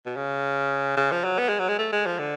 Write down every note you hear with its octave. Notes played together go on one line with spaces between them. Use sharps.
B2
C#3
C#3
F3
F#3
B3
G#3
F#3
G#3
A3
G#3
F3
D3